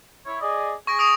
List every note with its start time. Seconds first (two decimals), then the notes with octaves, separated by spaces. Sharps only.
0.26 E4 C#5
0.41 G#4 D5 D#5
0.87 G#4 C#6 A#6 D7
0.99 D#6 D7 F7